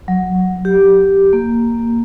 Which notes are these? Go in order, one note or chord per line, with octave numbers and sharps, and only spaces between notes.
F#3
G4
A#3